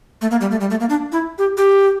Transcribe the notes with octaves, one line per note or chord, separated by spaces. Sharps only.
A3
A#3
G3
A3
G3
A3
A#3
D4
E4
G4
G4